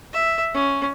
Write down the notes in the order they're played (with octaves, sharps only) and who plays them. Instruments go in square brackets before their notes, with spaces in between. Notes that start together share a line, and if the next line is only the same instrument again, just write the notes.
[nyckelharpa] E5
C#4